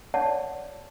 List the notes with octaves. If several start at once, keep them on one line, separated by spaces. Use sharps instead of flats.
C#5 D5 F#5 A5